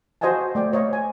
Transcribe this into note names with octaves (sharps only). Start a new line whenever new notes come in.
F#4 C5 D#5 F5 G#5 A5
A3 D5 G5
C5 C#5 D#5 F5
G#5